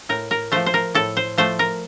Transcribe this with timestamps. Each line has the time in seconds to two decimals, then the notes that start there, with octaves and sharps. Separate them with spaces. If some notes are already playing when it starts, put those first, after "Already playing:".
0.09 A2 A#4
0.31 A#4
0.52 F3 A3 C5
0.66 C5
0.74 A#4
0.95 A2 A4
1.17 C5
1.38 F3 A3 C5
1.59 A#4